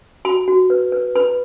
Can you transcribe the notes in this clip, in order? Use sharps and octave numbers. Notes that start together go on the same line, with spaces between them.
F#4 B5
F#4
B4
B4
B4 B5